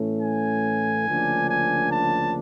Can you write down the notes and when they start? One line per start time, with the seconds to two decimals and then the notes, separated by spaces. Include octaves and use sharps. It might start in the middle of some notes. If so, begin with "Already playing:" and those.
Already playing: A2 E3 A3 C#4
0.21 G#5
1.06 D2 C#3 F3 A#3 D4
1.50 G#5
1.91 A5